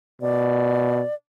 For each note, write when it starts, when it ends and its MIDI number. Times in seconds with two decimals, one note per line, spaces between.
0.22 1.02 47
0.22 1.14 74